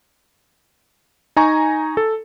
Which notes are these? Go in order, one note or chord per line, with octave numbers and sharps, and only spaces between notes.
D#4 G#5 A#5 C#6
A4